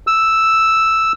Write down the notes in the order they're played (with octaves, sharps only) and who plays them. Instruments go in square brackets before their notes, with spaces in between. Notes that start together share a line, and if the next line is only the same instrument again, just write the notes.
[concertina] E6